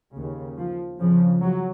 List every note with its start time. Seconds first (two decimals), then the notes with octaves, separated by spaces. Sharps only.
0.16 D#2 C#3
0.59 F3
0.99 F2 C#3 F3
1.42 F#3